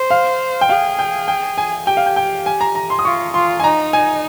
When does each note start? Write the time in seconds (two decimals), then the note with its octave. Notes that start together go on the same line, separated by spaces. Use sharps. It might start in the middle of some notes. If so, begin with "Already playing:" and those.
Already playing: C5
0.11 F5
0.61 G5
0.69 G#4 F5
0.99 G5
1.28 G5
1.58 G#5
1.87 G4 G5
1.97 F5
2.06 G5
2.16 G5
2.46 G#5
2.61 A#5
2.75 A#5
2.90 C6
2.99 D#6
3.05 F4 C#6
3.34 F4 C6
3.60 G#5
3.64 D#4 A#5
3.93 G#5